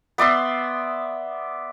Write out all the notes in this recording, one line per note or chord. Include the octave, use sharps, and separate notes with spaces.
B3 D5 E5 C6